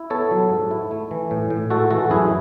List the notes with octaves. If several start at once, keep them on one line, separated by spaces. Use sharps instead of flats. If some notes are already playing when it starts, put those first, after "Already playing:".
Already playing: E4
B3 A4 C#5
F#3
G#2
E4
A3
E3
A2
A2
G#3 F#4 A4
E3 F#4 A4
F#2 E4 G#4